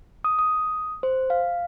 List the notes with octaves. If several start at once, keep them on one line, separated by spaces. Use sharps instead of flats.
D#6
D#6
C5
F5